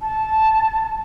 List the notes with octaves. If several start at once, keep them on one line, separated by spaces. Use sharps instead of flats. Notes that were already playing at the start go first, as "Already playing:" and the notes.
A5